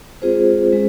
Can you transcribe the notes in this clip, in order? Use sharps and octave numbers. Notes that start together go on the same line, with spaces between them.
G#3 C4 F4 G#4 C5
G#3 C#4